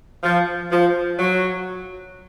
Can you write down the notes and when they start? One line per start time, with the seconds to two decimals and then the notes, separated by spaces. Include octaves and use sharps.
0.24 F3
0.71 F3
1.19 F#3